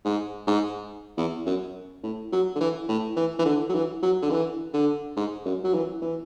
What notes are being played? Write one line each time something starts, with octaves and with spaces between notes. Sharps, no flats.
G#2
G#2
E2
F#2
A2
F#3
D3
E3
A2
E3
E3
D3
F#3
E3
F#3
D3
E3
D3
G#2
F#2
F#3
E3
E3